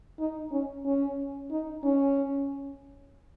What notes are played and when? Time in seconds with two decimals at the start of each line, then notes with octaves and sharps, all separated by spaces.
0.19 D#4
0.51 C#4
0.85 C#4
1.51 D#4
1.84 C#4